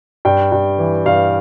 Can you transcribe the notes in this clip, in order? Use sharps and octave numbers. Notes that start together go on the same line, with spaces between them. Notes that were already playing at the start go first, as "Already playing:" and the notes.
G2 G5
G2
E3
G2 F5